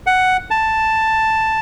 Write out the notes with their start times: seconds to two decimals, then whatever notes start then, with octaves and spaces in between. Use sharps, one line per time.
0.07 F#5
0.51 A5